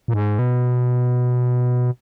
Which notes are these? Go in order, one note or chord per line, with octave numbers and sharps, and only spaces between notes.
A#2
G#2
B2